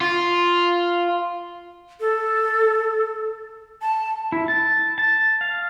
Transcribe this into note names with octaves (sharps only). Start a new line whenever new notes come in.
F4
A4
A5
E4
A5
A5
F5